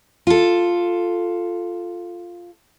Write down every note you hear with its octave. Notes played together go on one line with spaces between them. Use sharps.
F4 A4